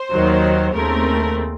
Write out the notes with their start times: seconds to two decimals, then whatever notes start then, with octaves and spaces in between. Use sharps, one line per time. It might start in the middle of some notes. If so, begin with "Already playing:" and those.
Already playing: C5
0.11 D#2 D#3 F#3
0.74 D#2 C#3 A3 C4 A#4